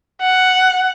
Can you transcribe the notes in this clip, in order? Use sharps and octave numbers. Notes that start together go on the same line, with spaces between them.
F#5